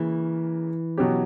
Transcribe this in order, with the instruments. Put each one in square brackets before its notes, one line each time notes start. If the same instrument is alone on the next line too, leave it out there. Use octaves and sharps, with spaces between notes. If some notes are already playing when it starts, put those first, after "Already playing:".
Already playing: [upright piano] C#3 A#3 [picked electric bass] E3
[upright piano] B2 F#3 C#4 G4